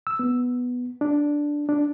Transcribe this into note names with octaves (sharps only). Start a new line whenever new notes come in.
E6
B3
D4
D4